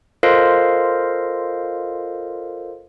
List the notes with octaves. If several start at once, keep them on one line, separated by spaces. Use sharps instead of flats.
F4 A4 A#4 C5 D#5 F5